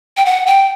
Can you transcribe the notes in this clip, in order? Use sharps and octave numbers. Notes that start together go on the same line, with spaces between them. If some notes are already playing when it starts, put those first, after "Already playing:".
G5
F#5
G5